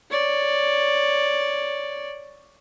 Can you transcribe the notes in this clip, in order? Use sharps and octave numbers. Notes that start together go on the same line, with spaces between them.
C#5 D5